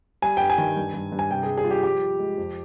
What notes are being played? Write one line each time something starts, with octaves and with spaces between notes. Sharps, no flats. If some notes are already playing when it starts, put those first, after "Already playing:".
G3 G#5
G2 G5
G#5
D#3
G2
G2
G2
G#5
C3 G5
G#4
G3
G#4
G3 F4
G4
F3 G4
F3
G#3
F2